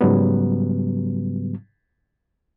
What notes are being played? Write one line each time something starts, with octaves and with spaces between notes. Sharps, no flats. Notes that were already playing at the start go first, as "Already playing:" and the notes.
G#2 C#3 F#3 G3 B3